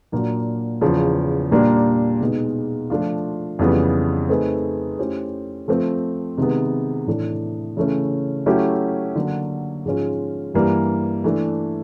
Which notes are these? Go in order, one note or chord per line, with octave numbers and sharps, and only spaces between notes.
A#2 F#3 A#3 D4 F#4
E2 C#3 F3
A#2 G3 A#3 D4 G4
B2 G#3 B3 D#4 G#4
F3 A3 D4 F4
F2 C#3 E3 G3 B3
A3 C4 D#4 G#4 B4
A3 C#4 E4 G4 C5
F3 A3 C4
C3 D#3 G#3 B3
A2 E3 A3 D4
C#3 E3 A3 C#4
F#3 A3 C#4 E4 G4
D3 F#3 A#3
G#2 F3 G#3 C#4 F4
G2 E3 G3 A#3
E3 A3 D4